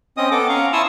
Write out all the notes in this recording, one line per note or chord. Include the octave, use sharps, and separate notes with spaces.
C4 C#4 D#5 D#6
B3 A4 D6
C#4 F5 A#5 C#6
E4 A5 C6 C#6 D#6 E6